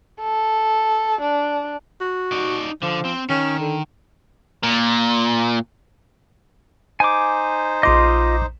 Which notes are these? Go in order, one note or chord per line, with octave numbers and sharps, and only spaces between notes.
A4
D4
F#4
D#4 D5
D3 F3
C4
D#3 C#4
D3
A#2
D#4 C5 G#5 D6
A#1 F4 D#5 C6 D6